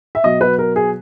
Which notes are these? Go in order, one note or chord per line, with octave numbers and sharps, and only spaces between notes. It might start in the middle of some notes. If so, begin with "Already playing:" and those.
E5
B2 F#3 D#5
B4
A#4
G#4